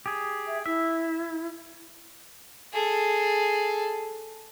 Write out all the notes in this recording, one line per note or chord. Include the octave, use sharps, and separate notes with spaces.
G4 G#4
E5
E4 E5
G#4 A4